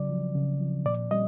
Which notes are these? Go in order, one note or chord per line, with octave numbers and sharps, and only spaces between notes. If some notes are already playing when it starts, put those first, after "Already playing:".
Already playing: C#3 F#3 D5
F3
C#3
F3
A#2 D5
G3 D#5